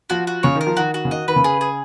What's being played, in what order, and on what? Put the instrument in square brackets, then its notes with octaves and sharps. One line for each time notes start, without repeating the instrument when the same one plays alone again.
[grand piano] F3 [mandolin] F#4
[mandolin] F#4
[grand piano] C#3 [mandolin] C#5
[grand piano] D#3
[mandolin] A#4
[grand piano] F3
[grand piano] D#3 [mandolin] F#4
[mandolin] F#4
[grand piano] C#3
[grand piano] D#3 [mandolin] D#5
[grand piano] D#3 [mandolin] B4
[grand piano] C#3
[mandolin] G#4
G#4